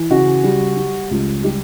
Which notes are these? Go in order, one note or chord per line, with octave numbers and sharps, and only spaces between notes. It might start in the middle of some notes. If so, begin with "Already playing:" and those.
Already playing: E3
C#3 F#4
G3
G3
C#2
G3 G4